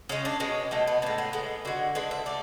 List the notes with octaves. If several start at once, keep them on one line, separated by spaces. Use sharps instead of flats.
C#3 G#3 C#4
D4
B2 G#3 C#4
B2 G#3 A3
B3
A2 G#3 D4
B3
A2 G#3 B3
D3 G#3 F#4
D3 G#3 B4
E5
A3 D5